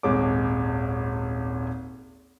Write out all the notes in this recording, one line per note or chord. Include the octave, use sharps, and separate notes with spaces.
D#1 G#1 G#3 C#5 D6